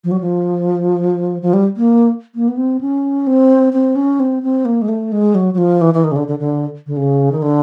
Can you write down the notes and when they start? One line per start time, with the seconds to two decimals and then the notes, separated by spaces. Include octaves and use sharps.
0.04 F3
0.11 F#3
0.21 F3
1.42 F3
1.53 G3
1.77 A#3
2.35 A#3
2.48 B3
2.57 C4
2.81 C#4
3.27 C4
3.73 C4
3.96 C#4
4.20 C4
4.43 C4
4.65 A#3
4.82 G#3
4.88 A3
5.12 G#3
5.35 F#3
5.54 F#3
5.58 F3
5.81 E3
5.94 E3
6.04 D#3
6.12 C#3
6.16 D3
6.28 D3
6.39 D3
6.87 D3
6.97 C#3
7.32 D#3
7.42 D3